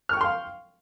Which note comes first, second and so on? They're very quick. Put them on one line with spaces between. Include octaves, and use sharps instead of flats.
F6 C#6 G5 C6 F5